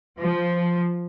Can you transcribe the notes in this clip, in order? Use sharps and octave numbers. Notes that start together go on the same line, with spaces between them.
F3